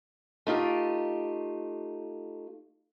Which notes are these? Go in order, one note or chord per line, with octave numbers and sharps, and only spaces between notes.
A3 D#4 F4 G4